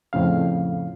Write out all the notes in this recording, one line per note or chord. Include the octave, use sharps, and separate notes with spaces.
F2 A2 C#3 F5